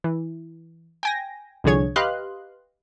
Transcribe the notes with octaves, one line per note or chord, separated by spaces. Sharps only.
E3
G5 G#5 A#6
C2 D3 F3 G#4 C#5 G#6
G4 B4 D#5 F5 C6 F#6